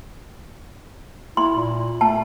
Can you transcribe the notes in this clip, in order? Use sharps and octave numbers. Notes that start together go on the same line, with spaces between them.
E4 C6
A#2
A3 A5